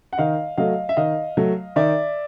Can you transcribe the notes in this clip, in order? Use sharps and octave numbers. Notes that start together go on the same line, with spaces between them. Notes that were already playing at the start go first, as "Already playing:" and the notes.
F#5
D#3 D#5 F5
F#3 A3 D#5 F5
E5
D#3 D#5 F5
F#3 A3
D#3 D5 E5